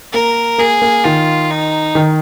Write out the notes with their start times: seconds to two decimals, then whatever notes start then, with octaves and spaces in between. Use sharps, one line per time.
0.13 A#3 A#4
0.58 A#3 G#4
0.82 A#3
1.05 D#3 F4
1.51 D#4
1.95 D#3